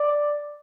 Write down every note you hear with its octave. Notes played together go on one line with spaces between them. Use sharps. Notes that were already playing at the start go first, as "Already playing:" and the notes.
Already playing: D5